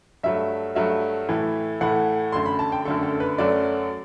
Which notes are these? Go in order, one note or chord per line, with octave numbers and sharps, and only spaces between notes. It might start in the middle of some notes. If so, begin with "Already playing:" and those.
G2 F#3 A3 E5
G2 F#3 A3 E5
A2 E3 A3
A2 E3 A3 F#5
F#2 D3 A3 C6
B5
A5
G5
F#2 D3 A3 A4
A4
B4
F#2 F#3 A3 D5